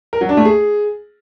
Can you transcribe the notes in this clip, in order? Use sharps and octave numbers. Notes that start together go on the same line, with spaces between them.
A#4
F#3
D4
A3
G#4